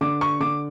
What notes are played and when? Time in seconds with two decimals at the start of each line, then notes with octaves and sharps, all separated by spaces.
0.01 D3 D6
0.21 C#6
0.40 D3 D6